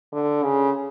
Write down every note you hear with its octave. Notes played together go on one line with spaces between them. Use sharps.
D3
C#3